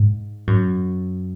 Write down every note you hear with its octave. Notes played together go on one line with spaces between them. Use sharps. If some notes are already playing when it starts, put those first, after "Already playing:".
Already playing: G#2
F#2